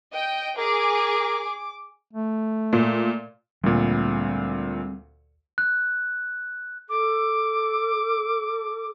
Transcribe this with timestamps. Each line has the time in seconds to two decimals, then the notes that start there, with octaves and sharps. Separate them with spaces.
0.13 D#5 G5
0.58 G#4 A#4 D6
2.13 A3
2.73 A#2
3.64 D2 A#2 G3 G#3 C4
5.58 F#6
6.89 A4 D6